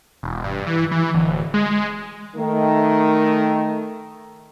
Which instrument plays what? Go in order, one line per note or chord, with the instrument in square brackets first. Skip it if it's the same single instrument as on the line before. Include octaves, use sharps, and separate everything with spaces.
[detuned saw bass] E1
G2
E3
E3
D1
G#3
[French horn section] D#3 A3